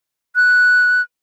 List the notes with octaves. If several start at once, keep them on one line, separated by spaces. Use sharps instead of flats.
F#6